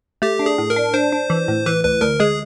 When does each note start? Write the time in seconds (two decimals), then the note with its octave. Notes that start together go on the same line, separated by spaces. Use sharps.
0.22 A3 G4
0.39 D4
0.46 G#4
0.58 A2
0.70 A#4
0.76 D4
0.94 D4 C5
1.12 D4
1.30 E3
1.48 A2
1.66 E3 B4
1.84 D2 B4
2.01 D2 A#4
2.20 G#3 G#4